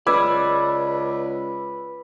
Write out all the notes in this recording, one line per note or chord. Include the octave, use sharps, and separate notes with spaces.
C#2 B4 D5 B5 D6 E6 G#6